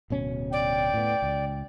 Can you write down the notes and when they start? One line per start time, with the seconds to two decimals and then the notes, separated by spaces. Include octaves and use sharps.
0.10 D1 B2 C#4
0.52 D5 G5
0.94 A2 B3
1.23 C#2